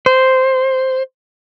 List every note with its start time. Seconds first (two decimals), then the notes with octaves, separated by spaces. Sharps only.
0.06 C5